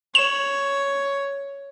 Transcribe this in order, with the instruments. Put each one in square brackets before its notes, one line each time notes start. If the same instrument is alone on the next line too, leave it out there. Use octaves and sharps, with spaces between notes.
[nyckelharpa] C#5 [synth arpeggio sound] E7